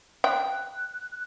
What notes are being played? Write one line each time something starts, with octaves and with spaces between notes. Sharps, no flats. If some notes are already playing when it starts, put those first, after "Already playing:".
G5 F#6